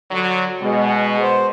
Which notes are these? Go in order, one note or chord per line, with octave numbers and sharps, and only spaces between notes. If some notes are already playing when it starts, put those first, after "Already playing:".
D3 F#3
B2 G#3
C5